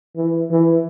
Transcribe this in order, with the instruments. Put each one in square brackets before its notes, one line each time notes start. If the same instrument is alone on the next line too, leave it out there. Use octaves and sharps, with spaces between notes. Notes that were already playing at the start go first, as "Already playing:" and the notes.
[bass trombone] E3
E3